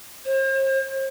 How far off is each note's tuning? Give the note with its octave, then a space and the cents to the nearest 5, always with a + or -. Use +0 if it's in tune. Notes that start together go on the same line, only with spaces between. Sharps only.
C5 +40